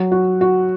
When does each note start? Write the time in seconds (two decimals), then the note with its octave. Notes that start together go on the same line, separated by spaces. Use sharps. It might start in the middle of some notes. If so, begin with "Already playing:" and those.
Already playing: F#3
0.12 F#4
0.41 F#4